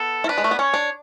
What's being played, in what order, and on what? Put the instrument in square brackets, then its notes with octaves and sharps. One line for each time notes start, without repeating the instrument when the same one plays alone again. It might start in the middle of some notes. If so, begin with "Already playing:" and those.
Already playing: [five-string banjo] B3 [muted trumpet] A4
[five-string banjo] E4
[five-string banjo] D4 [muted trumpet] B4
[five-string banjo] G#3
A3
B3
[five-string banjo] C#4 [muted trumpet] C#5
[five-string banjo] D4